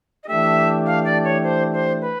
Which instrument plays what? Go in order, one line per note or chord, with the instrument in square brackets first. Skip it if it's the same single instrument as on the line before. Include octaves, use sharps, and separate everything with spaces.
[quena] D#5
[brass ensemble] E3 A3 D4 G4 [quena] E5
[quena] F5
D5
C#5
C5
C5
B4